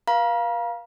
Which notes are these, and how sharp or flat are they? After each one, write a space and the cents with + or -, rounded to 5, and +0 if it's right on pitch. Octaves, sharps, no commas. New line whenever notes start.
B4 -45 F5 +0 A#5 +40